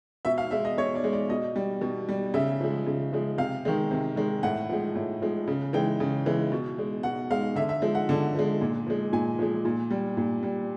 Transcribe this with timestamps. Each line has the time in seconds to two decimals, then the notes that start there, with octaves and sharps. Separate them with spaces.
0.25 B2 E5
0.38 F5
0.51 G#3 E5
0.65 D#5
0.77 B2 C#5
0.95 D5
1.04 G#3
1.13 D5
1.29 B2 D#5
1.56 G3
1.81 B2
2.09 G3
2.34 C#3 E5
2.61 F3 G#3
2.86 C#3
3.13 F3 G#3
3.38 C3 F5
3.65 D#3 G#3
3.91 C3
4.16 D#3 G#3
4.43 A2 F#5
4.69 F3 G#3
4.95 A2
5.22 F3 G#3
5.48 C#3
5.73 E3 G#3 G5
6.00 C#3
6.26 E3 G#3
6.52 B2
6.78 G#3
7.03 B2 F#5
7.31 G#3 F5
7.56 D3 E5
7.69 E5
7.82 F3 G#3
7.95 F#5
8.09 D3
8.35 F3 G#3
8.61 A#2
8.87 F3 G#3
9.13 A#2 G#5
9.39 F3 G#3
9.65 A#2
9.90 G3
10.17 A#2
10.43 G3